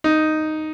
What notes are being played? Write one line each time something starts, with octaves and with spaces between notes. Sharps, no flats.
D#4